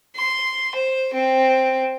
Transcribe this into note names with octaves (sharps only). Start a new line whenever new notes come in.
C6
C5
C4